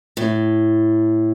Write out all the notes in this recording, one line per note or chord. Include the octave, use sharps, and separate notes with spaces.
A2